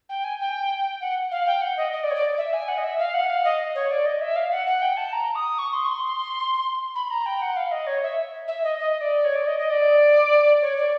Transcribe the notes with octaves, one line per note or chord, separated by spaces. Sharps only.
G5
G#5
G5
F#5
F5
G5
F#5
D#5
D#5
D5
C#5
D5
E5
G#5
F#5
D#5
E5
F5
F#5
F5
D#5
C#5
D5
D#5
E5
F5
F#5
F#5
G5
A5
A#5
D#6
C#6
C6
C#6
C6
B5
A#5
G5
F#5
F5
D#5
C#5
E5
E5
D#5
D#5
D5
C#5
D5
D#5
D#5
D5
C#5
D5